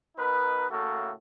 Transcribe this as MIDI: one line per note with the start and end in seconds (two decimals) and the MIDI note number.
0.17 0.69 47
0.17 0.69 63
0.17 0.69 70
0.17 0.69 71
0.69 1.11 45
0.69 1.11 49
0.69 1.11 57
0.69 1.11 58
0.69 1.11 66
0.69 1.11 69